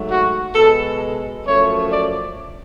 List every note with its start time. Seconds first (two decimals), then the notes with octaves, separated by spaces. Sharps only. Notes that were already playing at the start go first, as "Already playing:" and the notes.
Already playing: G#2 F#3 A3
0.09 F#4
0.55 B2 G#3 A4
1.45 F#2 F3 A3 C#5
1.91 D5